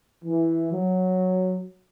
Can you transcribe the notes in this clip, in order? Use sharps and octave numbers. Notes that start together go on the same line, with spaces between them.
E3
F#3